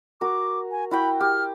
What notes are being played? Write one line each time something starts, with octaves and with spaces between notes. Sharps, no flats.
F#4 A#4 D6
G#5
E4 F#4 G5 B5
G4 F6